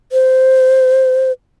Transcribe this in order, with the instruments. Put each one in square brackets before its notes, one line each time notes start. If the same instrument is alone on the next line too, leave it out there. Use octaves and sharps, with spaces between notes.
[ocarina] C5